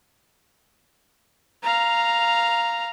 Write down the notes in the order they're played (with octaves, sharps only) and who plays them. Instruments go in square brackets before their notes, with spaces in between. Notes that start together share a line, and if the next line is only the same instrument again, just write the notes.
[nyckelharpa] F5 A#5